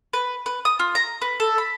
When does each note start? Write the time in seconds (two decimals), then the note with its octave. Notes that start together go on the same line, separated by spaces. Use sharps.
0.13 B4
0.46 B4
0.65 D#6
0.79 F4
0.95 A#5
1.22 B4
1.40 A4
1.58 B5